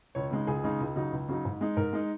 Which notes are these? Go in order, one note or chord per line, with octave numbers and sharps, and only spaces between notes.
C#2 C#5
C#3 G#3 D#4
C#2 G#4
C#3 G#3 D#4
C#2
C#3 F#3 D#4
C#2
C#3 F#3 D#4
G#2
G#3 D#4
G#2 A#4
G#3 D#4